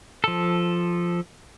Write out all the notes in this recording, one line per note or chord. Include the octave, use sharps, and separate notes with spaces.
F3 A4